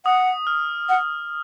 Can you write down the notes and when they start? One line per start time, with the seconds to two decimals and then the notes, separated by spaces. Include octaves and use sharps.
0.05 F#5 D#6
0.47 F6
0.89 F#5